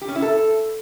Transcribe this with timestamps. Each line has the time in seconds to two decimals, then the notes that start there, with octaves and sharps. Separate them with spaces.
0.01 G4
0.08 C#4
0.15 E4
0.22 A4